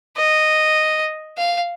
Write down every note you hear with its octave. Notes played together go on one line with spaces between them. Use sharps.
D#5
F5